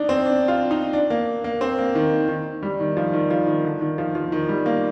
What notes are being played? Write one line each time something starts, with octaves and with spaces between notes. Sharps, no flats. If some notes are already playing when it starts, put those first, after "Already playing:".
Already playing: D4 D#4
C4
D4
F4
D#4
D4
A#3
A#3
C4
A#3
D#3
D#3
G3
D#3
F3
D#3
F3
D#3
D3
D#3
F3
F3
D#3
G3
A#3